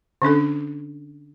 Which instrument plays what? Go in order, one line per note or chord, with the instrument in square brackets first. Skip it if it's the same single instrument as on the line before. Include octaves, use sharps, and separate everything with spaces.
[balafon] D3 C#4 D4 A4